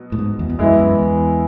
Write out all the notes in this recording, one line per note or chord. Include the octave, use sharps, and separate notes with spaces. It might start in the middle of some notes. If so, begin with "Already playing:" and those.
Already playing: B2 F#3
A2
G#2
E2
E2
F#2 E3 G#3 B3 E4
F#2
E2